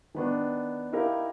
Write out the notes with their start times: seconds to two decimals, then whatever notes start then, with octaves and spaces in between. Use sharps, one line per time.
0.15 D#3 B3 D4
0.93 D#4 E4 G4 A#4 F5